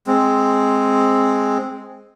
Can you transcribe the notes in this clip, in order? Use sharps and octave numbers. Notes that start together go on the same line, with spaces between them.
G#3 C4